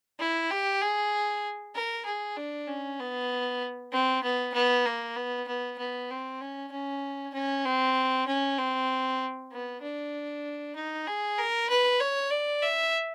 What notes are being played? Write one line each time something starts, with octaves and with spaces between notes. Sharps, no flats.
E4
G4
G#4
A#4
G#4
D4
C#4
B3
C4
B3
B3
A#3
B3
B3
B3
C4
C#4
C#4
C#4
C4
C#4
C4
B3
D4
D#4
G#4
A#4
B4
C#5
D5
E5